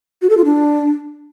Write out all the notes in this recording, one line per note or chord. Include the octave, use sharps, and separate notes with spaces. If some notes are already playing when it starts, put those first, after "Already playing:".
F#4
A4
F4
D4